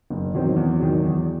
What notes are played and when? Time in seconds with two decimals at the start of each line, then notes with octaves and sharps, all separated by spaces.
0.10 F#1
0.33 E2 D#3 F#3 C4
0.56 E2
0.79 D#3 F#3
1.03 E2